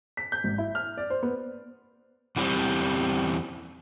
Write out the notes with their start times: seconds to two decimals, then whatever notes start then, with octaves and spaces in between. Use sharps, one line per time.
0.17 B6
0.32 G6
0.44 G#1
0.58 E4
0.75 F6
0.97 D5
1.10 C5
1.23 B3
2.36 E2 E3 G3 C4